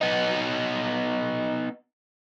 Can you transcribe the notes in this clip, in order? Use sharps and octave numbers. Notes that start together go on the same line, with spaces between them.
B3 D#4